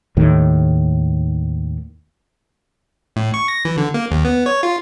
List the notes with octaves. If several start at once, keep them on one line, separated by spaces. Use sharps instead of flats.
D#2 A2 D#3
A2
C#6
A#6
E3
D3
A#3
D#2
B3
C#5
F4